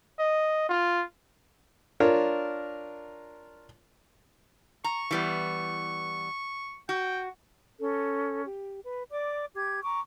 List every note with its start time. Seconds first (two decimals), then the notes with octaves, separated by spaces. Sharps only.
0.19 D#5
0.69 F4
2.00 D4 F4 A#4 C#5
4.84 A#5 C#6
5.11 E3 G3 B3
6.89 F#4 G5
7.80 C#4 A4
8.45 G4
8.85 B4
9.11 D5 D6
9.55 G4 G#6
9.83 A#5 C#6 D6